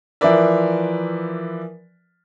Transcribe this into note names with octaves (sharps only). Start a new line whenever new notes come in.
E3 F3 A#4 B4 D5 E5